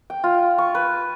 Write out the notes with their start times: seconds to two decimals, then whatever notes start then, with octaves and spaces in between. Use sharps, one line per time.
0.10 G5
0.24 F4
0.58 C#6
0.75 B4